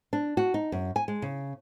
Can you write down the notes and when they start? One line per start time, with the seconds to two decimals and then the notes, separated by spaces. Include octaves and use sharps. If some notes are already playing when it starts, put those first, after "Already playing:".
0.13 D4
0.37 F#4
0.54 D#4
0.72 F#2
0.96 G#5
1.08 G#3
1.22 C#3